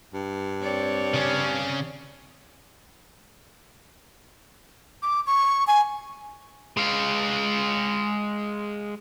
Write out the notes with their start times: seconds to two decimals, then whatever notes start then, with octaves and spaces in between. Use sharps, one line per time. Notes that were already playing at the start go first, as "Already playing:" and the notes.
0.14 G2
0.62 C4 C#5 D5
1.14 C#3 C#4
5.02 D6
5.27 C#6
5.67 G#5
6.77 G#3 F5